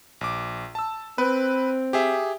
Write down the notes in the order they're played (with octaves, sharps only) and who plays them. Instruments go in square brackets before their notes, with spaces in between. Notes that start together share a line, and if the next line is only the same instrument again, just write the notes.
[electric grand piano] A#1 D6
A5 E6
[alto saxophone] C4 [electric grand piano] B4
[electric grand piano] G4 G#4 E5